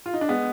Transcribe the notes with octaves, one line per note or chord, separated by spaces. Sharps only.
F4
D#4
D4
G#3 B3